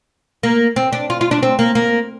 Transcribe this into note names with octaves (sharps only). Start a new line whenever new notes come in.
A#3
C4
D4
F4
F4
D4
C4
A#3
A#3